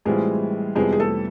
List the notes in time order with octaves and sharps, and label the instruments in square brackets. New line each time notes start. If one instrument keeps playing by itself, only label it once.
[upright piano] A2 E3 G3 C4 F4 [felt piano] G#3 G#4
[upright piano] F2 C3 E3 G3 B3 [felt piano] G#3 G#4
[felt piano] G#4
A3 A4